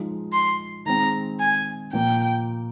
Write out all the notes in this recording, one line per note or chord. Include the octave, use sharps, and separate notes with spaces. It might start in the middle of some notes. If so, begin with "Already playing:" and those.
Already playing: F3 G#3 D#4
C6
D#3 G#3 C4 A#5
G#5
A#2 F3 A#3 G5